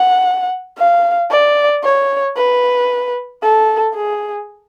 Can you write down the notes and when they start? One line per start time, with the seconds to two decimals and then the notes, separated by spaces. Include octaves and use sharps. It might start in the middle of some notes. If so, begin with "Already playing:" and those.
Already playing: F#5
0.78 F5
1.31 D5
1.84 C#5
2.37 B4
3.43 A4
3.95 G#4